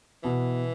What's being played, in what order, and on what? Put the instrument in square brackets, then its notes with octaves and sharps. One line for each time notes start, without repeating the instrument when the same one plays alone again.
[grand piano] B2 [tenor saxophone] E3